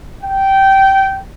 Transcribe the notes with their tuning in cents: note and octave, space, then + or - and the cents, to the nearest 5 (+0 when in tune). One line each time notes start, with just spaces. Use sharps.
G5 -15